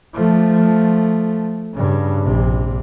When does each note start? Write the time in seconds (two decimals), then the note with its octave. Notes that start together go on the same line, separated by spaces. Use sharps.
0.14 F3 A3
1.75 G2 C#3
2.23 A#1 C3